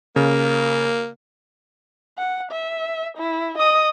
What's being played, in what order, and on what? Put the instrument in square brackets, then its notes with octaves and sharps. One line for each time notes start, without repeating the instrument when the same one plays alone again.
[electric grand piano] C#3 [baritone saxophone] A#3
[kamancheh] F#5
E5
E4
D#5 D#6